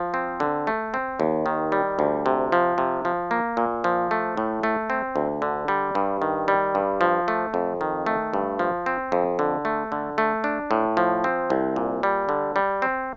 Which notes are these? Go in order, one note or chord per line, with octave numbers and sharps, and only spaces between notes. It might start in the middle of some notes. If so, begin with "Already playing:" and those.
Already playing: F3
C4
D3
A3
C4
D#2
D#3
G3
D2
C3
F3
C3
F3
A#3
A#2
F3
A3
A2
A3
C4
D2
D3
G3
G2
D#3
G3
G2
F3
A3
F2
D#3
A3
G2
F3
C4
F2
D3
A3
D3
A3
D4
A2
F3
C4
C2
A#2
G3
D3
G3
C4